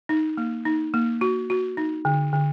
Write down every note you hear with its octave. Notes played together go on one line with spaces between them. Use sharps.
D#4
A#3
D#4
A#3
F#4
F#4
D#4
D3
D3